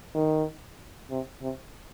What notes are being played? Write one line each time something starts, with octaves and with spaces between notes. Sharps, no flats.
D#3
C3
C3